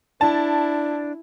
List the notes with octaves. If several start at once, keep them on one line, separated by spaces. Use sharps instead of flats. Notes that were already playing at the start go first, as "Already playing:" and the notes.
D4 E4 A5